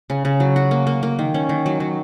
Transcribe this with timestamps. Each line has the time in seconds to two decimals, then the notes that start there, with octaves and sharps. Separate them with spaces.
0.10 C#3
0.25 C#3
0.40 F#3
0.56 F#4
0.71 A#3
0.87 A#3
1.03 A#3
1.19 D#3
1.34 C#4
1.49 D#3
1.66 F#3
1.80 F#3